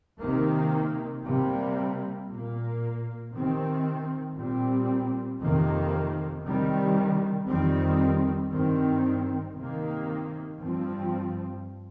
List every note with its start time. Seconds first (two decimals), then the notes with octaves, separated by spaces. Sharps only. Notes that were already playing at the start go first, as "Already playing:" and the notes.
0.19 C3 D#3 A#3
1.24 C3 G3 A#3
2.28 A#2 A#3
3.32 C3 D#3 C4
4.36 A#2 G3 C4
5.40 F2 C3 D#3 A#3
6.44 C3 D#3 G3
7.48 F2 D#3 G3 C4
8.53 G2 D#3 C4
9.57 C3 D#3 A#3
10.61 G2 F3 C4